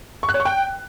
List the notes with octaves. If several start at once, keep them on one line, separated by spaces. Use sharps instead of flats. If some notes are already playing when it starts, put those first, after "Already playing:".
C#6
F#6
C#5
C#6
G5